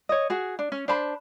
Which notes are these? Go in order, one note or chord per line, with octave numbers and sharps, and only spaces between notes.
C#5 D#5
F#4 G#4
D4
C#4
D4 C5 A5 B5